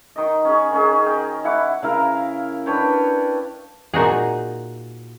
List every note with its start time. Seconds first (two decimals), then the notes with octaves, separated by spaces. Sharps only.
0.16 D#3 D#5
0.45 C#4 G#4
0.72 D#3 C#4 G#4
1.06 A#4 G5
1.44 E4 F#5 B5 D6
1.82 C#3 E4 A#4 F5
2.66 D4 B4 C#5 G5
3.94 A#2 D#4 F#4 G#4